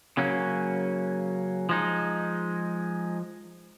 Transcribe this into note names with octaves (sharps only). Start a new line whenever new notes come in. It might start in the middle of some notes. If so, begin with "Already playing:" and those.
C#3 F#3 A#3 C#4
F3 G#3 D#4